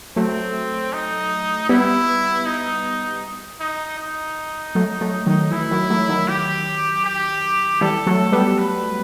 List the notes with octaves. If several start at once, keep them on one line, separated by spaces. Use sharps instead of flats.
F#3 A3 C4
D#4
G3 B3 E4
D#4
D#4
D#4
F#3 A3
F#3 A3
D#3 F#3
E3 E4
D#3 F#3
F#3 A3
D#3 F#3
G4
G4
E3 G3 A4
F#3 A3
G3 B3
B4